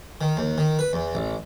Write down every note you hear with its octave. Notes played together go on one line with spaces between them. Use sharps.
D#3
D#2
D#3
B4
E2
A1